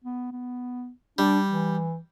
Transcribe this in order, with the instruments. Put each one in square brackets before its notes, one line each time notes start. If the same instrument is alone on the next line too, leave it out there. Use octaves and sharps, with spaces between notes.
[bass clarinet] B3
B3
[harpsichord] G3 [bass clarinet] D4
[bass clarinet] E3